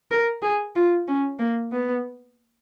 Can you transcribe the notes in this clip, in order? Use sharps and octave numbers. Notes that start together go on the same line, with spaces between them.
A#4
G#4
F4
C#4
A#3
B3